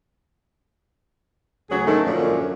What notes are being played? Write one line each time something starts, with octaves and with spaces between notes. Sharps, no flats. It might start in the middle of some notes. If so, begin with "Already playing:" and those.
D2 C#3 F#3 G#4
G#2 D#3 A3 A4
F#2 A#2 D3 F3 C#4